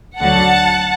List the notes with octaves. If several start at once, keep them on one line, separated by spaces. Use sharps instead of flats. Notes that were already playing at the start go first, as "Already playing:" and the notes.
D2 D3 F#3 F#5 A5